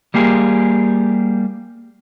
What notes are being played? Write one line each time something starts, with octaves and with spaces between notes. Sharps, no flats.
G3 A#3 G4 G#4